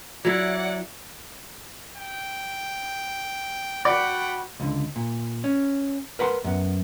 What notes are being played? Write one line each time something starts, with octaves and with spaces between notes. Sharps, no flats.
F#3 E4 D5 F#5
G5
F#4 D5 F#5 G5 B5
C#2 D3
A#2
C#4
A#4 B4 F#5 B5 C6
F#2 B3